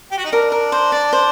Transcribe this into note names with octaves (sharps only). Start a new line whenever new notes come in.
G4
F#4
D#4
D4 A#4
A#4
C5
D5
C5